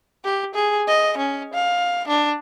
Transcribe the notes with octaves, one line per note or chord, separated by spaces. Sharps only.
G4
G#4
D#5
C#4
F5
D4